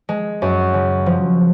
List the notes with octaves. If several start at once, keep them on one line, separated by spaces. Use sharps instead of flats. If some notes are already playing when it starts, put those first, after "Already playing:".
G#3
F#2
C#3
F3